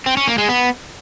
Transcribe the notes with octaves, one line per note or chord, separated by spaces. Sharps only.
C4
C#4
A#3
G#3
B3